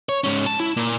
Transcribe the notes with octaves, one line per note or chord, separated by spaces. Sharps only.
C#5
G#2 C#4
A5
E4
A#2